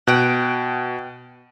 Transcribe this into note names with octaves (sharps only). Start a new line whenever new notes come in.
B2 F#5 G5